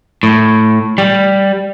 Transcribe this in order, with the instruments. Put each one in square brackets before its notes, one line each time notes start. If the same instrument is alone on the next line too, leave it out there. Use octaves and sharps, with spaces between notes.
[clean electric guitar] A2
G3